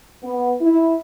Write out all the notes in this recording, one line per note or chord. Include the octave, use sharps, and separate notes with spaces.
B3
E4